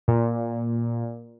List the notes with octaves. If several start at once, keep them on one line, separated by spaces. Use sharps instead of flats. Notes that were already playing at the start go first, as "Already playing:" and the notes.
A#2